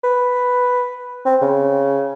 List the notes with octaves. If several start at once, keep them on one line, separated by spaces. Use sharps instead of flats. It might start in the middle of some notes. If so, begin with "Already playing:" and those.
B4
C4
C#3